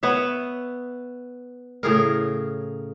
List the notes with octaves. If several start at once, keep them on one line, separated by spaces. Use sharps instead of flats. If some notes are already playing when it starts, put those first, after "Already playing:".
B3 C#5 E5
A2 C#3 G#4 A#4